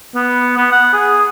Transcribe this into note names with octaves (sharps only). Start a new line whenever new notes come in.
B3
B3
F#5
G#4